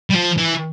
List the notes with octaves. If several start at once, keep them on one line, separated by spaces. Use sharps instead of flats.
G3
F3
E3